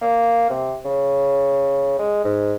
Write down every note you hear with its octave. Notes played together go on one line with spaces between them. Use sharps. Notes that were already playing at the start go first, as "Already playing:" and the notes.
A#3
C3
C#3
G#3
G#2